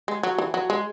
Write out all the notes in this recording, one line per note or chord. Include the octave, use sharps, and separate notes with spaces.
G#3
F#3
E3
F#3
G#3